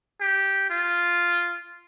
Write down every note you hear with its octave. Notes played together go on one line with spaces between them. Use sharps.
G4
F4